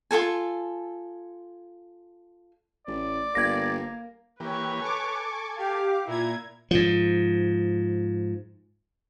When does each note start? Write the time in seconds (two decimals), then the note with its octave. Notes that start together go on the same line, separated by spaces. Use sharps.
0.11 F4 G#4 A4 G#5
2.87 A1 D5
3.35 G1 A#3 G#6 A#6
4.40 E3 A#3 G4 B4 C#5
4.82 A4 G#5 C#6 D6
5.58 G4 F5 D6
6.07 A#2 E4 A#5 G#6
6.71 G#2 F3